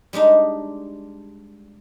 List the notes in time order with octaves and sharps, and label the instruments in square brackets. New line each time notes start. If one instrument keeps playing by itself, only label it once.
[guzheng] G3 G#3 D4 D#4